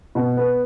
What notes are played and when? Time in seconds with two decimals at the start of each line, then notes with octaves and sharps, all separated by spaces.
0.15 B2
0.37 B3